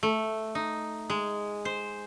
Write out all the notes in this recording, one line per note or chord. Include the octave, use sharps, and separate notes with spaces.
A3
D#4
G#3
C5